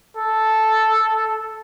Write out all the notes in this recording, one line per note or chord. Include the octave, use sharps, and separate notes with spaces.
A4